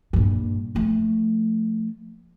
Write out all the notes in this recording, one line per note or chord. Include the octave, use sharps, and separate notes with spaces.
G2 A#2
F3 A3